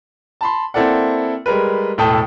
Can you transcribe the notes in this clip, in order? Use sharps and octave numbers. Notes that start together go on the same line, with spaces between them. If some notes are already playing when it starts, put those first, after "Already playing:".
A5 B5 C6
A#3 C4 E4 A4 D5 F#5
G3 G#3 A#4 B4
E1 A2 A4 G5 A5 D#6